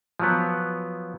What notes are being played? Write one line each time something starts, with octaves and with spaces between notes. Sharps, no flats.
F3 F#3 B3